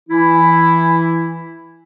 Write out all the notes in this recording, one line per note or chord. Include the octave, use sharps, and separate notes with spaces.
E3 E4